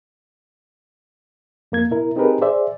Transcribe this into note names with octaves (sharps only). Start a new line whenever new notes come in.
F2 A#3 G#6
B2 E4 A#4
C4 D#4 G4 G#4 A#4 B4
G#4 C5 D5 E5